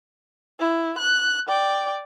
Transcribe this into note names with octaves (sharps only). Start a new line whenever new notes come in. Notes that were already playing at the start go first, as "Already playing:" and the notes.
E4
F#6
D5 G5